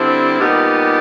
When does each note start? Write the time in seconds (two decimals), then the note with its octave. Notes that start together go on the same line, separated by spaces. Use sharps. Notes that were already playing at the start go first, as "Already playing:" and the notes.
Already playing: D3 G3 C4 E4
0.39 A#2 G3 B3 D#4 G4